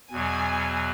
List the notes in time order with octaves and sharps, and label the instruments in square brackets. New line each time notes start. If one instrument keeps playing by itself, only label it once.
[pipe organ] E2 B2 F#3 [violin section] G#5